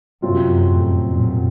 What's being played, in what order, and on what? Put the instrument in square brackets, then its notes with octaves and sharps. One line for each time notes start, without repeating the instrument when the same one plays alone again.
[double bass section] F#2 [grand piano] C3 F#3 C4 F4
[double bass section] F2 A2
F#2 A#2